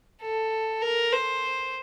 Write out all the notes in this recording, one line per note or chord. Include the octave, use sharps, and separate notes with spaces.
A4
A#4
C5